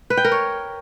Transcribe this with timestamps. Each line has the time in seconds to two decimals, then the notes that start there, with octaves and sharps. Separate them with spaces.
0.10 B4
0.17 G5
0.25 A#4
0.32 C#5